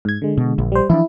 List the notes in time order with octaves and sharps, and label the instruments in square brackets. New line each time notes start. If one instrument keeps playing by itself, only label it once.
[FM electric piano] G#2 G#6
D3 G#3
[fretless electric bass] B2
A#1
[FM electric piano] G3 C5
[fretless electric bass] E3 F3 D4 [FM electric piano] E4